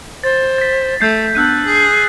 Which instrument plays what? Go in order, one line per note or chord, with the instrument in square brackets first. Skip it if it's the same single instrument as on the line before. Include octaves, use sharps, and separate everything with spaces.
[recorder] C5 [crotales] A6
[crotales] A6 B6
[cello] A3 [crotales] G6 C7
[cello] B3 [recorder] D4 [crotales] E6 F#6 D#7
[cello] G#4